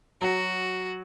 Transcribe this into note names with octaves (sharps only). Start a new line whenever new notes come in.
F#3 F#4